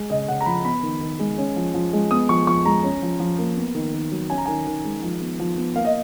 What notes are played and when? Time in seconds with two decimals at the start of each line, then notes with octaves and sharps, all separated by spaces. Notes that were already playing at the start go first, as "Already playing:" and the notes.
Already playing: G#3
0.10 C#3 D#5
0.28 C#3 F#5
0.41 A#5
0.46 F3 B5
0.64 B3 B5
0.83 D#3
1.01 D#3
1.20 G#3
1.38 C#4
1.56 F3
1.74 F3
1.93 G#3
2.11 B3 D#6
2.29 F3 C#6
2.47 F3 C#6
2.66 G#3 A#5
2.83 C#4
3.02 F3
3.20 F3
3.38 A#3
3.57 B3
3.75 D#3
3.94 D#3
4.12 F#3
4.30 C#4 G#5
4.38 A#5
4.46 D#3 G#5
4.67 D#3
4.85 G#3
5.03 F3
5.21 B3
5.40 F3
5.58 B3
5.76 A#3 F5
5.85 D#5